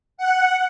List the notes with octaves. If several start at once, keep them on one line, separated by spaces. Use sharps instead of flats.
F#5